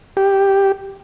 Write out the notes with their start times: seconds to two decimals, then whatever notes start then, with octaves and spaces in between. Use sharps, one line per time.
0.17 G4